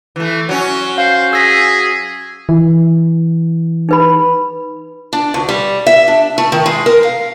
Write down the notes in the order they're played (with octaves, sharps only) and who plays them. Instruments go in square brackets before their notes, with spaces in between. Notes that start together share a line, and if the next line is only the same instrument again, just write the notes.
[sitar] E3 A3
F#3 C#4
[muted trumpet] C5 [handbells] F5
[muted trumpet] G#4 [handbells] E6 A#6 B6
[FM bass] E3
[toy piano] D#4 B4 B5
[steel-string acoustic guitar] D4
D2
G3
E5
D4
A3
D#3
G#3
A#4
F5